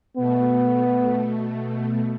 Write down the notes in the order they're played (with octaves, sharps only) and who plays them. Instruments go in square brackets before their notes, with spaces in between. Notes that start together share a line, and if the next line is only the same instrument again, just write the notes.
[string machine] B2 A3 [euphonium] B3